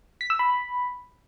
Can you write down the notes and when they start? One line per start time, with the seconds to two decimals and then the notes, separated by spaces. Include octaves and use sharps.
0.21 B6
0.30 E6
0.39 B5